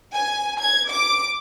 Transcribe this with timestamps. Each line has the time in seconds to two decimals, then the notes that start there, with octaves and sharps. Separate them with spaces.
0.13 G#5
0.60 G#6
0.91 D6